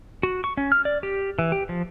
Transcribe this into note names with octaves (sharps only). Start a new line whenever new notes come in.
F#4
C#6
C#4
F6
D5
G4
E3
G4
F3